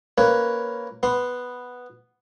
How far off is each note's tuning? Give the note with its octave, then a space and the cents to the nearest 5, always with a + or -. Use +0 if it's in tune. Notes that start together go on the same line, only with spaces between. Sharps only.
A#3 +0 C#4 +0 B4 +0
B3 +0 C6 +0